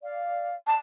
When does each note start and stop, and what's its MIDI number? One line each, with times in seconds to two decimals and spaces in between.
0.02 0.53 74
0.02 0.53 77
0.67 0.76 81